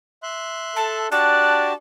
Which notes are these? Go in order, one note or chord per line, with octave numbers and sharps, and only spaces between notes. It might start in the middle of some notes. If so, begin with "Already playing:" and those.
E5 C6 F#6
A4 A5
D4 F#4 G4 D5 A5 F#6